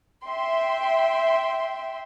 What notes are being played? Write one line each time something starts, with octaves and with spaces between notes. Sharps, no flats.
E5 G5 C6